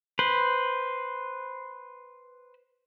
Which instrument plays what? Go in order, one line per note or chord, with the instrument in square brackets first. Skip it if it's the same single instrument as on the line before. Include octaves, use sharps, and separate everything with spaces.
[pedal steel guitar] B4 C5